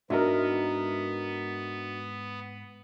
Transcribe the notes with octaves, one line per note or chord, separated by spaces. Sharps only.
G#2 B3 D4 F#4 A#4 D#5 E5